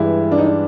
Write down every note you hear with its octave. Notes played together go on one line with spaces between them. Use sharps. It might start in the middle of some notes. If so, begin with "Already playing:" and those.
Already playing: G2 E3 G#3 E4
D4
D#4
D4